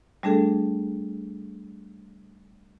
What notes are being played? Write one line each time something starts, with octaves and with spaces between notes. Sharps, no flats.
G3 A3 D4 G#4 A4